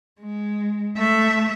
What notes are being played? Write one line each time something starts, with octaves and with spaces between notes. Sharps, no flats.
G#3
A3 E5